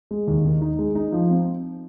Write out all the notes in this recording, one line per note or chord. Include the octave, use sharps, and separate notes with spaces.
G#3
D#2
D#3
D#4
G#3
D#4
F3
C4